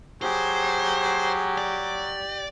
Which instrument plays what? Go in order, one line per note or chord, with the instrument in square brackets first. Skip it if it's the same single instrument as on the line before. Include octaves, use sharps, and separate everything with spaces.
[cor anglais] F#3 [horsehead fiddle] G4 [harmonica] G#4 [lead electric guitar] C5
[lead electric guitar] D5